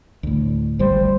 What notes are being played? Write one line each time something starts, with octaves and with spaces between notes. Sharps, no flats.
D2 A2
G#1 D2 G3 C5